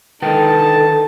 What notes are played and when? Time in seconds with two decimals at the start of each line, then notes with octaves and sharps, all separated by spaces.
0.22 D3 D#3 D#4 A4 B4 G5 A5